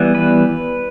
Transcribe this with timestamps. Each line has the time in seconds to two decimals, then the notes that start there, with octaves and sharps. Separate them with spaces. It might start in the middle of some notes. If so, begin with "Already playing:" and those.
Already playing: E3 G3 B3
0.15 B4